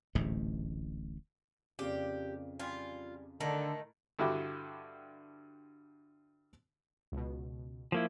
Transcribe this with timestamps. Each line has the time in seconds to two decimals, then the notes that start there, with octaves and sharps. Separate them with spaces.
0.15 D1 A1 G#2 A3
1.79 F2 C#3 A#3 G4 D5
2.60 E3 G3 F4 G#5
3.41 A2 D3 D#3 A3 A#5
4.19 G2 D3 E4 F#4 G4
7.12 C#2 B2
7.92 F3 A#3 E4